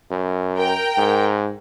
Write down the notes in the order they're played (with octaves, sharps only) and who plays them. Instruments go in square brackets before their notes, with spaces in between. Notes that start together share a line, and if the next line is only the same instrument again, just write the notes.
[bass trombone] F#2
[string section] A#4 G5
[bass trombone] G#2